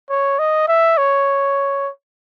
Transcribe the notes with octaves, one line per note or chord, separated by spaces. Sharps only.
C#5
D#5
E5
C#5